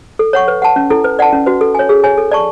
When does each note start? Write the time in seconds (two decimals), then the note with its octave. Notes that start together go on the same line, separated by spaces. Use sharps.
0.19 A4
0.33 C#5 F#5 C#6
0.48 B4
0.62 F#5 A5
0.76 C#4
0.90 E4 A4
1.04 B4
1.19 D5 F#5 A5
1.33 C#4
1.46 F#4 B4
1.61 A4
1.75 C#5 G#5
1.89 G#4
2.04 C#5 G#5
2.17 A4
2.32 D5 A5 C#6